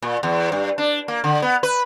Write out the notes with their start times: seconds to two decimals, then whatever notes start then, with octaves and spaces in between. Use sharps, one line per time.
0.02 A#2
0.23 E2
0.52 G2
0.78 D4
1.08 A#3
1.24 D3
1.42 B3
1.63 B4